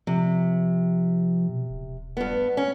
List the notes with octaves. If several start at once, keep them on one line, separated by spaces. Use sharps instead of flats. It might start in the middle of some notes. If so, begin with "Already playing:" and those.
C3 F3
B2
D#1
G2 B3
C#4